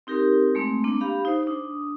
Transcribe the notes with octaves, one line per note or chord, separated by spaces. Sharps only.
C4 D#4 G4 A#4
G#3 A3 C4
A#3 D4
G4 F5 B5
D#4 C5
D4 D#6